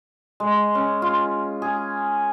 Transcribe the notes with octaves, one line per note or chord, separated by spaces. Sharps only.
G#3
C#4
F4
G#4